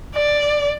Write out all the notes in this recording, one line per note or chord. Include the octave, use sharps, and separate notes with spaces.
D5